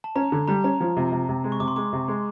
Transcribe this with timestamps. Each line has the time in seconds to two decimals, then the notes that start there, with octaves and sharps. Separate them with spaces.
0.04 A5
0.15 C#4 A#5
0.32 D3
0.48 G3 A#5
0.64 C#4 A#5
0.80 F3
0.97 C3
1.12 C3
1.29 C3
1.44 G#3
1.52 C#6
1.60 C3 D6
1.68 C6
1.76 G#3 D6
1.93 C3
2.08 G#3